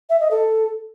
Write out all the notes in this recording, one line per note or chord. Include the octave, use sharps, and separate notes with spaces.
E5
D#5
A4